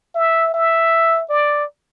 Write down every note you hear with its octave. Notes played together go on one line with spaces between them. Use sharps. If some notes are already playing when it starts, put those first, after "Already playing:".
E5
E5
D5